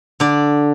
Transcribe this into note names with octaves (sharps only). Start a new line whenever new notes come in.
D3 D5